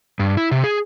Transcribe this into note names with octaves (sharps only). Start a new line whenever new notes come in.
G2
E4
C3
G#4